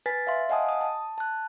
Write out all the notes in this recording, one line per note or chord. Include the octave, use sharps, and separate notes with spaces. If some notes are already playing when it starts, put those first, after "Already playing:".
B4 G#5 A6 B6
E5 F5 C6
D#5 F5 F#5 G#5 A5 D#6
D#6
A5
A5 F#6